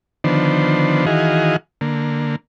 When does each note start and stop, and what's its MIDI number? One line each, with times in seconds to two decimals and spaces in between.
0.24 1.06 50
0.24 1.06 51
0.24 1.06 53
0.24 1.06 59
0.24 1.06 62
0.24 1.06 72
1.06 1.56 51
1.06 1.56 52
1.06 1.56 66
1.06 1.56 68
1.06 1.56 75
1.06 1.56 77
1.81 2.36 50
1.81 2.36 58